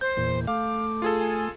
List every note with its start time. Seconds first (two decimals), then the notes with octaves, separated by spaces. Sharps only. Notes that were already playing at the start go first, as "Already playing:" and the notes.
0.01 C5 G6
0.17 E2 A#2
0.47 A3 F5 D6
1.02 F4 G#4 A4
1.20 G#5